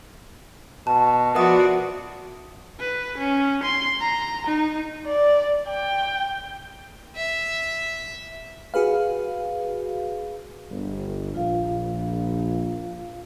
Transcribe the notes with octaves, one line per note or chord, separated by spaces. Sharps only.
B2 A5
F3 B3 F#4 A#4 D5 E5 D#6
B4
C#4
C6
A#5
D#4
D5
G5
E5
F#4 G#4 B4 F5
G1
A#1 F4 F5